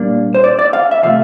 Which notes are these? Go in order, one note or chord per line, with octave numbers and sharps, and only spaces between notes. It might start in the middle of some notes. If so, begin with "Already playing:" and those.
Already playing: A#2 G3 A#3 D4
C5
D5
D5
F5
E5
C3 F3 A3 F5